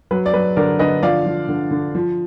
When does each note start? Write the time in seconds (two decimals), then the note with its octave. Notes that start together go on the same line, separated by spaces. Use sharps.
0.11 F#3 B4
0.26 D5
0.33 F#3 B4
0.57 D3 A#4 D5
0.79 D3 B4 D#5
1.03 F3 D5 F5
1.26 F3
1.49 D3
1.71 D3
1.95 F3